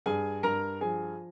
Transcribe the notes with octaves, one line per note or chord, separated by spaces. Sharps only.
G2 G#4 G#5
G2 A#4 A#5
F3 G#4 G#5